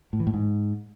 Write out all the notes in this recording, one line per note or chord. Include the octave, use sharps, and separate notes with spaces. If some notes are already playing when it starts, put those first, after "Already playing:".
A2
E3
A2
G#2